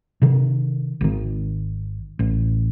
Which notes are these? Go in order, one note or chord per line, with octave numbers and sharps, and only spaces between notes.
C3 D#3
G#1 D#3
A1